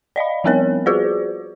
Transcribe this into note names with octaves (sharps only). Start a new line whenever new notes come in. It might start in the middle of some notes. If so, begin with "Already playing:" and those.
D5 D#5 F5 B5
F3 G3 B3 C4 A#4 C#5
F4 F#4 G#4 B4 C5 D5